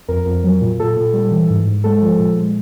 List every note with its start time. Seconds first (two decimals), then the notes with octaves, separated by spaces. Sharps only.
0.08 F2 A#4
0.26 F2
0.44 F#3
0.62 A#2
0.79 A#2 A4
0.96 A#2
1.14 G3
1.31 E3
1.50 G#2
1.67 G#2
1.84 G#3 A4
2.02 F3
2.19 A#2
2.37 G#3